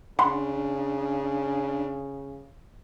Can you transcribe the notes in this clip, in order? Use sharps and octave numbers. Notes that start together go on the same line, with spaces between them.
C#3 D4 F#5 B5 C6